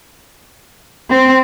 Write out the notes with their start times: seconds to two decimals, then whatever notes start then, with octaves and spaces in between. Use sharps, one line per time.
1.12 C4